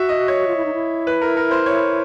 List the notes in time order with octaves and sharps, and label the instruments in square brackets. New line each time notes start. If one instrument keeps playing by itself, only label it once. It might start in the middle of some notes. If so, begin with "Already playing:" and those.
Already playing: [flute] F#4 [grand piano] E5
[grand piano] D#5
C#5
[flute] F4
E4
D#4
E4
[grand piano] B4
A#4
A#4
C5
C#5